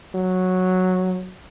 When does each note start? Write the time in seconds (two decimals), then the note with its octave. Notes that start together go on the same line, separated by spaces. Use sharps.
0.15 F#3